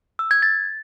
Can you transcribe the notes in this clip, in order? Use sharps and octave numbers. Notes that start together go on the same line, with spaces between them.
E6
G#6
A6